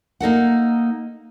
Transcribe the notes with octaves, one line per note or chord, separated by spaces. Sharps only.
A#3 D#4 A4 F#5